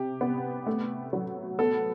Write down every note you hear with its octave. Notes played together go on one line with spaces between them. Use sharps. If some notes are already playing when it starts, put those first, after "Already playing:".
Already playing: C3 G4
B3
A3
F#3
B3 A4